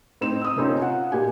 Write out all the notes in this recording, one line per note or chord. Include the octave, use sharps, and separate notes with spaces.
A2 C4 D#4 E7
D#6 E6
C3 A#3 C4 C#4 D#4 F4
F4 F#5
A#2 G4 G#5